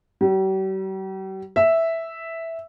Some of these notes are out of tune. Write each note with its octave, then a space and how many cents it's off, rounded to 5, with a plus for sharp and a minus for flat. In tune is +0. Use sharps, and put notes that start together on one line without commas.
G3 -45
E5 -5